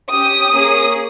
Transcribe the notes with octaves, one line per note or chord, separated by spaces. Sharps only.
C#4 G4 D#6
A#3 C#4 G#4